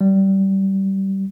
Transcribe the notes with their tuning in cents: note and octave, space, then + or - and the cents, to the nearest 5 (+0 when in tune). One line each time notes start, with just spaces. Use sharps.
G3 -20